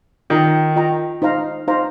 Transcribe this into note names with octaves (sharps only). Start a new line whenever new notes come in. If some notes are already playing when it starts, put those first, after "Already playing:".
D#3 F4 D#5 G5 A#5
F4 D#5 G5 A#5
D#4 C5 F5 A#5
D#4 C5 F5 A#5